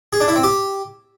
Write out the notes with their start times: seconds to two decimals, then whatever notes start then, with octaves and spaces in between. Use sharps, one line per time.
0.13 G#4
0.20 D4
0.28 E4
0.36 C4
0.43 G4